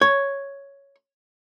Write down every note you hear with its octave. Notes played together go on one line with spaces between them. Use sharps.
C#5